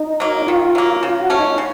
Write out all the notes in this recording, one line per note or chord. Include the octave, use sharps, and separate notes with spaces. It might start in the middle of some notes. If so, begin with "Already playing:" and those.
Already playing: D#4
F#3 A#3
D#3 F4
F#3 A#3
C#3
F4
F#4
A3 C#4
D#4
C#3